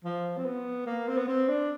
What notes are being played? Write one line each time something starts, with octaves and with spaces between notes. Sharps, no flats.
F3
C4
B3
A#3
C4
B3
C4
D4